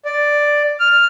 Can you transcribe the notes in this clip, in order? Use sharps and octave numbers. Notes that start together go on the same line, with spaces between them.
D5
F6